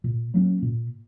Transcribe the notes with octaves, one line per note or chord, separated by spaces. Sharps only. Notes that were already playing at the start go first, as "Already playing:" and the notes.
A#2
F#3 A#3 C#4
A#2